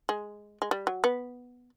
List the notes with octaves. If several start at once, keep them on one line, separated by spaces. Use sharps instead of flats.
G#3
G#3
G3
F#3
B3